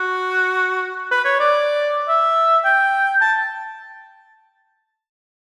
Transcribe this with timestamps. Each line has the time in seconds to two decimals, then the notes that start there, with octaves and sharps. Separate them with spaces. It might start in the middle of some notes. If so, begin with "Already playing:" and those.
Already playing: F#4
1.11 B4
1.25 C#5
1.40 D5
2.09 E5
2.65 G5
3.21 A5